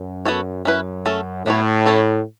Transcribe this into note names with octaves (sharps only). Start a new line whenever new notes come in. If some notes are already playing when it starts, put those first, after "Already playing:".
Already playing: F#2
B3 F#4 A4 C#5
F#2 C#4 E4 B4
A3 C#4 A4
A2 F#3 B3 E4 C#5
C#4 A4 C#5